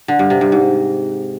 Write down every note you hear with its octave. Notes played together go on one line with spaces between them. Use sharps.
D3
G2
C3
G2
G#2